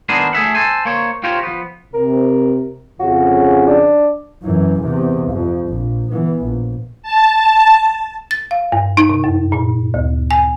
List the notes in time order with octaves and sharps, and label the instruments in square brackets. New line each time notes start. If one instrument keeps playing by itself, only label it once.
[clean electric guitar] D#3 B3 D4 G#4 A#4 C5
A3 G#4 E5 F#5
A4 C5 G#5
A#3 C5 C#5
F4 G4 A#4 C5 C#5
F3 B3
[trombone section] C3 [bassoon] A#4
[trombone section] F2 C#3 [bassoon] F#4
[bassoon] D4
[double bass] F#2 E3
E2 C3
F2
A#1
E3 B3
A#1
[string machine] A5
[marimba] A6
F5
G2
D#4
C3
F#2
A#2
D2
G#5